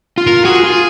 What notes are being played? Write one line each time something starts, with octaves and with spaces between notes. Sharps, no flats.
F4
A#4
F#4 G#4
F4